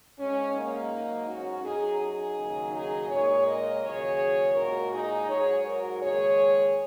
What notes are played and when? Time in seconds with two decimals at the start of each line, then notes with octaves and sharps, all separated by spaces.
0.17 G#2 G#3 C#4
0.53 A#3 D#4
0.90 G#2 F#3
1.27 C#4 F#4
1.63 F#2 F#3 D#4 G#4
1.99 D#4 G#4
2.36 D#2 C#3 F#3
2.73 D#4 G#4
3.09 A#2 G#3 G#4 C#5
3.45 A#4 D#5
3.82 D#2 C#3 F#3 G#4 C#5
4.55 A#2 G#3 F#4 A#4
4.91 D#4 G#4
5.28 G#2 F#3 G#4 C#5
5.65 F#4 A#4
6.01 D#2 C#3 G#3 G#4 C#5